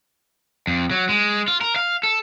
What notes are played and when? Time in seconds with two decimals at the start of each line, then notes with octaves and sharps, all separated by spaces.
0.67 F2
0.91 F#3
1.09 G#3
1.48 F4
1.61 A#4
1.76 F5
2.03 A4